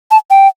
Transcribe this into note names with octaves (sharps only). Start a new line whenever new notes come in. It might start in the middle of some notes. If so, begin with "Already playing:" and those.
A5
G5